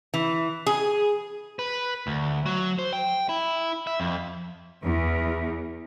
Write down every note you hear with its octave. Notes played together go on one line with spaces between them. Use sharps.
E3
G#4
B4
D2
F#3
C5
G5
E4
E5
F2
E2